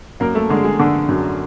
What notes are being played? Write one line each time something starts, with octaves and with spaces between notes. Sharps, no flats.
F#2 A#3 A#4
A3 A4
D3 G#3 G#4
G#3 G#4
D3
F#2